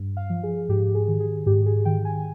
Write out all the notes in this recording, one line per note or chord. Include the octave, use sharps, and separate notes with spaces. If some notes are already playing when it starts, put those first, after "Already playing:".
Already playing: G2
F5
F3
G#4
G#2 G4
G#4
D#3
G#4
G#2 G4
G#4
D#3 G5
G#5